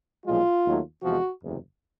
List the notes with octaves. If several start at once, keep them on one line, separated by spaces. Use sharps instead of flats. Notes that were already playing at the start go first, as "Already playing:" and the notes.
B1 A#2 F3 G#3 F4
D#2 D#3 F#3 A3
E2 C3 F3 G#3 F#4
F#1 E2 C3